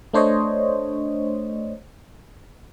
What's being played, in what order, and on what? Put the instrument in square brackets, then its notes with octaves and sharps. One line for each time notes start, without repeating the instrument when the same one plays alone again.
[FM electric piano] A3 D4 C5 C#5 D#5